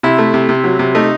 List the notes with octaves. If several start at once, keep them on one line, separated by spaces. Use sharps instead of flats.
C3 E4
A3
C3
C3
F#3
C3
A3 D#4